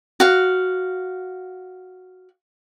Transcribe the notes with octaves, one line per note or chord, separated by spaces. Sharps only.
F#4 F5